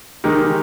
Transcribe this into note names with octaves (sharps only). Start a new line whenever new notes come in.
D#3 G#3 D#4 G4 A#4